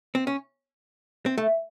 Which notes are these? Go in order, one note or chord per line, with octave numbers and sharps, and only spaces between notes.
C4
C#4
C4
A3